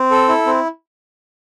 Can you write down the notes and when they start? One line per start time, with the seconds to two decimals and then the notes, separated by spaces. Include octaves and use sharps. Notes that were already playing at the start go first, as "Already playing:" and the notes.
Already playing: C4
0.11 A4
0.28 E4
0.46 C4